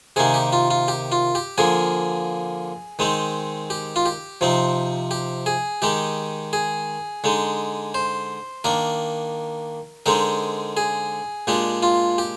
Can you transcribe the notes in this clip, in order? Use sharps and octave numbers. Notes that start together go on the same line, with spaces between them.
C3 D#3 A#3 D#4 G#4
G4
F4
F4
G4
F4
G4
D3 F3 A#3 G#4
D#3 G#3 C4 D#4
G4
F4
G4
C3 F3 C4 D#4
G4
G#4
D#3 G#3 D#4 G4
G#4
D3 G#3 D#4
C5
D#3 A#3 D4 A#4
D3 G#3 C4 D#4 A#4
G#4
A#2 G#3 D4 G4
F4
G4